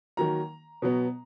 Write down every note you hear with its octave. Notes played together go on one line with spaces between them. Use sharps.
D#3 F#3 A#3 A#5
B2 F#3 B3